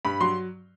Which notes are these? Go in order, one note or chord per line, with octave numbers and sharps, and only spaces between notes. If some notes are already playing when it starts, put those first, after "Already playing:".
G2 B5
F#3 C6